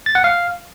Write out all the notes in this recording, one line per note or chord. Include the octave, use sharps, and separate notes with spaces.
A6
F#5
F5